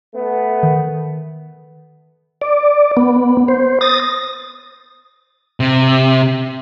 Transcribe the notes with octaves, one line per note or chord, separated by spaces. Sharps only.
A3 B3
D#3
D5
B3
C5
D#6 A6 A#6
C3